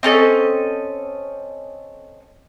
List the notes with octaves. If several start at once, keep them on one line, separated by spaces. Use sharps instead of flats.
C4 C#4 A4 D#5